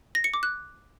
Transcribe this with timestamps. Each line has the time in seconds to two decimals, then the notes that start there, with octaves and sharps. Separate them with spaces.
0.15 A#6
0.24 C#7
0.34 D6
0.43 F#6